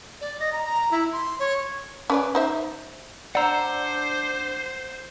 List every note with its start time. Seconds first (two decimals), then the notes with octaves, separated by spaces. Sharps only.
0.21 D5
0.40 D#5
0.53 A#5
0.66 A#5
0.91 E4
1.12 C6
1.39 C#5
2.10 C#4 B4 D5
2.35 D#4 C5 E5
3.35 D4 C5 D5 F#5 A#5 E6